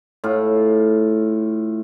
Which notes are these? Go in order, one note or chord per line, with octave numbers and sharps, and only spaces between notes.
A2 F4